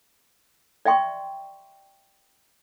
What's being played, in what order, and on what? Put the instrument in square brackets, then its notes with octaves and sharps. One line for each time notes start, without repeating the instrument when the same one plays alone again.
[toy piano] D5 E5 G5 C6 C#6